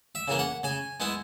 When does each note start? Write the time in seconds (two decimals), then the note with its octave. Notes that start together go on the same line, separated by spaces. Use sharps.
0.15 E5
0.28 C#3 E3 A#3
0.39 F#5
0.63 C#3 G#5
1.00 G#3 B3 E4